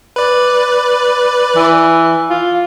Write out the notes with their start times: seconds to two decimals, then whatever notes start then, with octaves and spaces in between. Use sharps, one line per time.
0.16 B4 D5
1.56 E3
2.30 F4